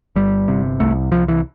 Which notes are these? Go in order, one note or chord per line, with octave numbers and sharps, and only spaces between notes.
G1 G3
C3
C2 A3
C2 F3
E3